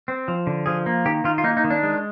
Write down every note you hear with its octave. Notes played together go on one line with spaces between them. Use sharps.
C4
F3
D3
F3 G#4
A#3
D#3 G4
D#3 F4
F4
A#3 D#4
D#4
D#3
D4
G#3